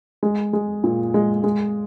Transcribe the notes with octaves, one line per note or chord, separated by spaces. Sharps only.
G#3
G#3
A#2
G#3
G#3